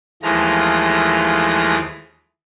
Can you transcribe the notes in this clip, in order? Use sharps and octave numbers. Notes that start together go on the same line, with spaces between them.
D#2 E3 F3 G#3 A3 A#5